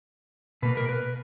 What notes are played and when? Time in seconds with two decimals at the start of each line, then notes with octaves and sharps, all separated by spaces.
0.62 B2 A#3 B4
0.77 A#4
0.89 B4